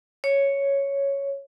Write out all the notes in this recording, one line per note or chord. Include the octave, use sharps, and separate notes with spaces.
C#5